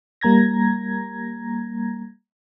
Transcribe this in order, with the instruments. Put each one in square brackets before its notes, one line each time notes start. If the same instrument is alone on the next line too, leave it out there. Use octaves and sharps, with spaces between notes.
[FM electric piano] G3 A#3 A#5 G#6 A#6